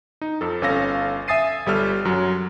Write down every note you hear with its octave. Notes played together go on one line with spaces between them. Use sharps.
D#4
F2 A4
G1 C#4 A4 F5 A#6
E5 G#5 D#6 A6 C7 D#7
G1 G3 A4 F6
F#2 F#3